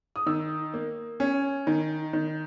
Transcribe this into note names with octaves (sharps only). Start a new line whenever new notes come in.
D#6
D#3 E6
A#3
C#4
D#3
D#3